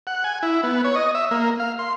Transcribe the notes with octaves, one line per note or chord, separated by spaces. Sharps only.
F#5
G#5
E4
B3
C#5
D#5
E5
A#3
F5
C6